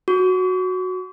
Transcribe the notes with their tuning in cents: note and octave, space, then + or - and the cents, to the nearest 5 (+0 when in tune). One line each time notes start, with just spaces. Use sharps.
F#4 -5 C#6 +45